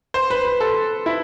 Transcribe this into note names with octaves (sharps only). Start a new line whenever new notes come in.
C5
B4
B4
A4
E4